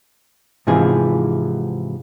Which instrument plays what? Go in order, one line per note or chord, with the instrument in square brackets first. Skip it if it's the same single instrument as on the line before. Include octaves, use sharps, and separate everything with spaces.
[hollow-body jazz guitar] G#2 C3 E3 F3 G#4